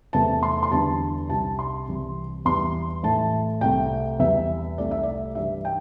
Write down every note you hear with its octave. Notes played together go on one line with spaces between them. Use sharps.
E2 C3 A3 A5
C6
C6
E2 D3 G3 A5
C2 C3 G3 A5
C6
C2 C3 E3 G3
E2 E3 G3 C6
A2 E3 A3 A5
C2 C3 A3 G5
E2 E3 G3 E5
C2 C3 A3 D5
E5
D5
G2 E3 G3 E5
G5